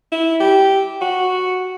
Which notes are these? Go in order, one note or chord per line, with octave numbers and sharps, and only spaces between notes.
E4
G4
F#4